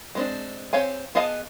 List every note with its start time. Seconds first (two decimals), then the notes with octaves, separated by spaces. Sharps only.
0.15 G#3 C4 D4
0.73 C4 G4 C#5 F5 G#5
1.15 B3 G#4 D#5 F5 A5